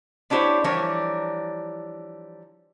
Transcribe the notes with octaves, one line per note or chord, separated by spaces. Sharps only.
B3 D4 E4 G4 C5 C#5
E3 F3 G3 D4 A#4 C#5